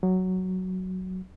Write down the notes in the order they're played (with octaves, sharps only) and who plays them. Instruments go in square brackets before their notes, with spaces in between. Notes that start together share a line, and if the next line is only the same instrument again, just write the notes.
[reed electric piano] F#3